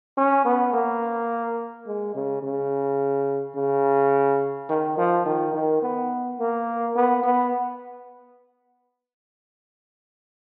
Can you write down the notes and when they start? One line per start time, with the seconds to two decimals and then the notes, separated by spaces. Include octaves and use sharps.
0.17 C#4
0.45 B3
0.73 A#3
1.87 G#3
2.15 C#3
2.43 C#3
3.56 C#3
4.69 D#3
4.98 F3
5.26 D#3
5.54 D#3
5.83 B3
6.39 A#3
6.96 B3
7.23 B3